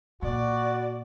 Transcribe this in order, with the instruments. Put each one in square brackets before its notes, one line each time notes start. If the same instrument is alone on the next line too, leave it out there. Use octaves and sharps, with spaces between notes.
[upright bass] A#2 [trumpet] F#4 [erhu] D5